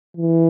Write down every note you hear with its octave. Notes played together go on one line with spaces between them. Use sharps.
E3